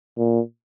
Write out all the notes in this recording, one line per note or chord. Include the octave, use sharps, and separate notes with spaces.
A#2